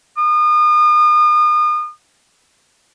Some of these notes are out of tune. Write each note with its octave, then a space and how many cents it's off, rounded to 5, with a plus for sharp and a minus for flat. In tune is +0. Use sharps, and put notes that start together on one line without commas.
D#6 -40